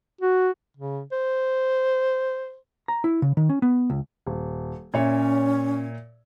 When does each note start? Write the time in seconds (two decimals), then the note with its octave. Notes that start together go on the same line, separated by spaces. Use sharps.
0.21 F#4
0.77 C#3
1.12 C5
2.88 A#5
3.04 E4
3.22 C#3
3.37 D#3
3.49 C#4
3.62 B3
3.90 C#2
4.27 D#1
4.94 A#2 C#4 C#5 E5